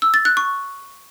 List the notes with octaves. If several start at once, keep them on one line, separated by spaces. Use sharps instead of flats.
E6
A6
F#6
C#6